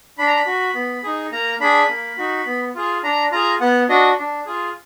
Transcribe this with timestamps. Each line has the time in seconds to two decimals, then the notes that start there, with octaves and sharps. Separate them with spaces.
0.18 D4 B5
0.27 A#5
0.36 B5
0.46 F#4
0.75 B3
1.03 D#4 G#4
1.32 A#3 A#5
1.60 D4 G#4 B5
1.89 A#3
2.18 D#4 F#4
2.46 B3
2.75 F4 G#4
3.03 D4 A#5
3.31 F4 G#4 A#5
3.60 B3 F#5
3.89 D4 F#4 D#5
4.18 D4
4.46 F4 G#4